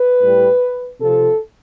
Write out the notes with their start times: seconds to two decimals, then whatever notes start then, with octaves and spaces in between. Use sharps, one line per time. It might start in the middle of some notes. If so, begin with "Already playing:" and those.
Already playing: B4
0.21 A2 G3
1.00 C3 F3 A4